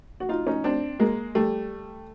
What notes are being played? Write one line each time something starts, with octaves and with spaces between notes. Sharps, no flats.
F#4
D#4 F4
C#4 D#4
C4 D4
G#3 A#3
G3 A3